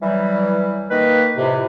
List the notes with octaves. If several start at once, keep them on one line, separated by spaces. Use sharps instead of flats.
E3 F#3 G3
D#3 A#3 B4
F2 A2 C3